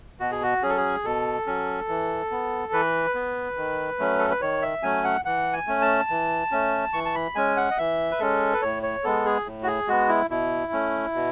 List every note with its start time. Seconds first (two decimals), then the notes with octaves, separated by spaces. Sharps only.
0.20 B2 F#4
0.32 G#4
0.43 F#4
0.62 F#3 C#4 G#4
0.70 A4
0.77 G#4
1.04 B2 A4
1.47 F#3 C#4
1.88 E3
2.31 B3
2.73 E3 B4
3.15 B3
3.57 D#3
3.99 F#3 A3 C#4
4.19 A4
4.30 B4
4.41 D#3 C#5
4.62 E5
4.83 F#3 A3 C#4 G#5
5.04 F#5
5.25 E3 F#5
5.53 G#5
5.67 A3 C#4
5.82 A5
6.10 E3
6.51 A3 C#4
6.93 E3 C#6
7.05 A5
7.15 B5
7.35 G#3 C#4 G#5
7.57 F#5
7.71 D#5
7.78 E3 E5
8.11 B4
8.20 G#3 C#4 A4
8.53 B4
8.62 A2 C#5
8.83 C#5
9.04 G#3 B3 A4
9.26 G#4
9.46 A2
9.63 F#4
9.67 G#4
9.88 G#3 B3 F#4
10.09 E4
10.30 B2 E4
10.72 A3 C#4
11.15 B2